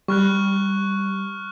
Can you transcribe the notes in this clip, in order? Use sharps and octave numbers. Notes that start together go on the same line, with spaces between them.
G3 C#6 F6 F#6